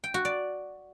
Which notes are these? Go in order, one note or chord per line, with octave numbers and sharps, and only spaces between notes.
G5
F#4
D5